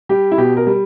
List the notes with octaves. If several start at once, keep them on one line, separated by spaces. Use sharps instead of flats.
G3 G4
E4
B2 G4
A#4
G3